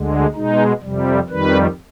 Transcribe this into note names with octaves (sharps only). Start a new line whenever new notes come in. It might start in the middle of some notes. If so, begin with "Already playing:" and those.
Already playing: D2 D3 G#3
B2 G#3 D#4
F2 C3 G3
F2 D#3 G3 B4